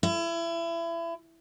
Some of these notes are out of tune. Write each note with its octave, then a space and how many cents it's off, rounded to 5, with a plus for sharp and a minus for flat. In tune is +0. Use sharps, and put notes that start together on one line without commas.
E4 +30